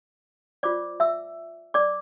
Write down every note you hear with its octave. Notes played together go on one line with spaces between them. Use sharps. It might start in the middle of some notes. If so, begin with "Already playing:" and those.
F4 C5 D5 D6
E5 E6
D5 D6